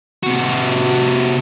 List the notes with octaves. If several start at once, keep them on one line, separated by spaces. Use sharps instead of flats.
C3 F#4